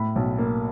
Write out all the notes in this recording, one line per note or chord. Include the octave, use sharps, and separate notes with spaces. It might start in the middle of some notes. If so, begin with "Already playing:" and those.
Already playing: A2 B5
B1
A#3